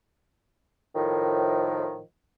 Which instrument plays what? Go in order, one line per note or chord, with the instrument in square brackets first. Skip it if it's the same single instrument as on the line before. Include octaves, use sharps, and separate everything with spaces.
[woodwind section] A2 D#3 F3